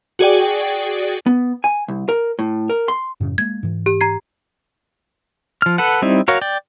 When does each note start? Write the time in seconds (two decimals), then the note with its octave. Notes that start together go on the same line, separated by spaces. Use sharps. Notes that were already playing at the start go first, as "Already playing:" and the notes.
0.19 F#4 G#4 D5 G5
1.26 B3
1.64 G#5
1.88 C2
2.09 A#4
2.39 A2
2.70 A#4
2.88 C6
3.20 F#2 A2 C#3
3.38 G#3 A#3 G#6
3.63 G#2 E3
3.86 G4
4.01 A#5 G#6 C7
5.62 F3 F6
5.78 A4 B4 F#5
6.02 G3 C4 D#4 E4
6.28 F#4 A#4 C#5 F5
6.41 D5 G5